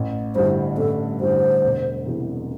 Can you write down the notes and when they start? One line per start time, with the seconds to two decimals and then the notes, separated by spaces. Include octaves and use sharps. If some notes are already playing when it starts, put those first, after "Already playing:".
Already playing: A1
0.35 G2 D3 G3 E4 C5
0.78 A1 A4
1.20 G2 D3 G3 E4 C5
1.63 E1
2.06 E2 C3 E3